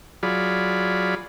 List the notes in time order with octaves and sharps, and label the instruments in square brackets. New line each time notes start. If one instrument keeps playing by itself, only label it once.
[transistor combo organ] F#3 F4 G#4 D5 B5